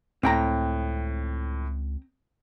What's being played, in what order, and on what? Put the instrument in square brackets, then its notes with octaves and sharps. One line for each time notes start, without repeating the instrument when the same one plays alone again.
[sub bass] C#2 [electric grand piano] A2 [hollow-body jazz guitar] C4 G5 A#5